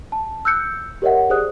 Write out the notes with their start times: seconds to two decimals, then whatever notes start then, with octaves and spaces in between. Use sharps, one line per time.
0.12 A5
0.45 E6 F#6 G6 C#7
1.02 G4 A#4 C#5 D#5 E5 F#5
1.30 G4 G#4 C5 D5 D#6 F#6